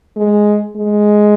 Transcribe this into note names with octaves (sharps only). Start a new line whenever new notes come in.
G#3
G#3